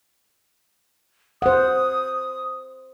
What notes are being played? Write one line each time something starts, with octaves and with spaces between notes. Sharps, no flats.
C5 F#5 D#6